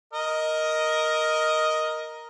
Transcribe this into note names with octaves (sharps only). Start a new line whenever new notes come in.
A#4 D#5